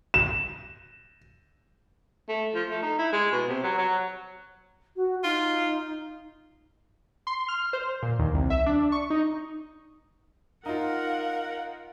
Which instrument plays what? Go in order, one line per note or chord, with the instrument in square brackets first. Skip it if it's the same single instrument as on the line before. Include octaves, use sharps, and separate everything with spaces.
[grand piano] E7
[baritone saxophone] A3
F3
A3
D#4
E4
G#3
B2
C3
F#3
F#3
[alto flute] F#4
[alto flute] D#4 [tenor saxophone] F4
[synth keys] C6
F6
C5
A#2
D#2
C2
E5
D4
C#6
D#4
[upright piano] D#4 F4 [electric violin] A#4 F#5 [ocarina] F5